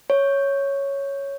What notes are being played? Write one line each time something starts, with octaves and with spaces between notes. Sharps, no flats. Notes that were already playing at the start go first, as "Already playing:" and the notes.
C#5